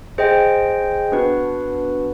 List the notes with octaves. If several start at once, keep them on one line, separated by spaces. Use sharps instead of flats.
G#4 C5 D#5 G5
B3 D4 F#4 B4